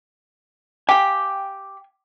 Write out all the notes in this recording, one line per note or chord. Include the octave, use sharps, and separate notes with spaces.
G4 F5 G5 G#5